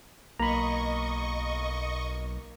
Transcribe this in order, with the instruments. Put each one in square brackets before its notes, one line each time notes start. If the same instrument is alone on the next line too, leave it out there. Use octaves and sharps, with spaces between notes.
[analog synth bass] B1 [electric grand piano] A#3 [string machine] D#5 C#6 [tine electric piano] A#5 B5